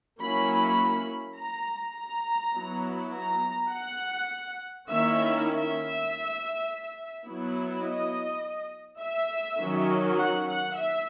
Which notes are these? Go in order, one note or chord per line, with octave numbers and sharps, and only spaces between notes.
F#3 A#3 C#4 E4 B5
A#5
A#5
F#3 B3 E4
A#5
F#5
D#3 A#3 C#4 E4 E5
E5
F#3 B3 E4
D#5
E5
D#3 F#3 C#4
F#5
F#5
E5